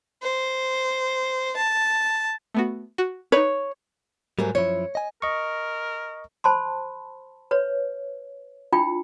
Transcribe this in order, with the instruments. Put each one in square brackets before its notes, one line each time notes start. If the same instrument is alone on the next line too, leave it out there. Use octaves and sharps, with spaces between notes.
[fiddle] C5
A5
[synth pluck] A3 B3 F#4
F#4
[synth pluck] D#4 B4 [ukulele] C#5
[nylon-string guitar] G#2 F#3 A#4 [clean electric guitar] G3 A3
[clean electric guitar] F#2 F3 E4 [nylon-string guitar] C#5
[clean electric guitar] D#5 G#5
[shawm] A#4 [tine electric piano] D#5 C#6
[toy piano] C5 A5 B5 C6
B4 C#5
D4 E4 F4 G5 B5